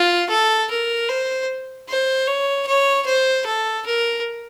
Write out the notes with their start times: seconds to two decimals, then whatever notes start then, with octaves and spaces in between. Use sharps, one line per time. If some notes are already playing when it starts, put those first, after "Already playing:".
Already playing: F4
0.30 A4
0.71 A#4
1.09 C5
1.89 C5
2.27 C#5
2.67 C#5
3.06 C5
3.46 A4
3.86 A#4